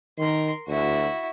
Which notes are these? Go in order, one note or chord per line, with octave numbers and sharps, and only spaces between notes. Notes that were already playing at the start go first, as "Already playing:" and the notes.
D#3 A#4 C6
D2 E4 F#4